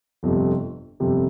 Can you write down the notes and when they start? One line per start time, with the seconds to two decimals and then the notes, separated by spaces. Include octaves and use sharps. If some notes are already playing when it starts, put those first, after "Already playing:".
0.23 G1 F2 C3 G3
1.00 G1 F2 C3 G3